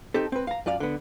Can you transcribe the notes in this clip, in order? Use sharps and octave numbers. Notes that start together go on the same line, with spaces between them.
C4 D#4 G4 A4
C4 B4
F5 A#5
F#2 F4 D5 F5
D3 B3